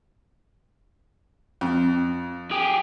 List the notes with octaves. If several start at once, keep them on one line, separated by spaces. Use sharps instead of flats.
F2
G4 G#4